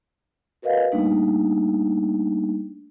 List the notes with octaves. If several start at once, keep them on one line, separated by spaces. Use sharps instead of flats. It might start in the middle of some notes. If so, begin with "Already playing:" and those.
F#4 A#4 B4 D#5 F5 F#5
G3 A3 A#3 D4 D#4